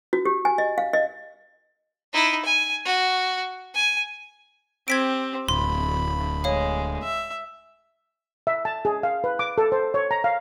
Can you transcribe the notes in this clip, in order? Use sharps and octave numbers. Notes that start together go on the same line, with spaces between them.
F#4
G4
G#5
D#5
F5
D#5
D#4 E4
G#5
F#4
G#5
C4 G4 G#6 B6 D7
D1 B5 C6
G#3 C#5 F5
E5
E5
A5
G#4
F5
B4
D6
A4
C5
C#5
A#5
F5